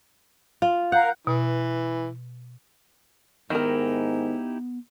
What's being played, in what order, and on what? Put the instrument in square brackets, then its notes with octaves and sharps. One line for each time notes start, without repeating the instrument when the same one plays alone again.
[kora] F4
[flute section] A#4 F5 G6 [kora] F#5
[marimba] B2 [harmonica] E3
[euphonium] G#2 [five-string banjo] D#3 A#4 [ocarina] B3 [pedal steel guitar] D#4 E4 G4